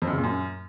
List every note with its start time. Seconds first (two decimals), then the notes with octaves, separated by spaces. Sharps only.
0.02 F2
0.07 F#2
0.13 C#3
0.18 A#2
0.23 F#2